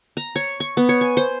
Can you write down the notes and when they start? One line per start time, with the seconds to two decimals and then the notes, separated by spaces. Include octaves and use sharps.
0.17 A#5
0.36 C#5
0.60 C#6
0.77 B3
0.89 C#5
1.01 G#5
1.17 C5